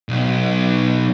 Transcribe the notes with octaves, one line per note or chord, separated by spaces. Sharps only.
B1